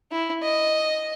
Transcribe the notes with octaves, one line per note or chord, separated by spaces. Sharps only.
E4
D#5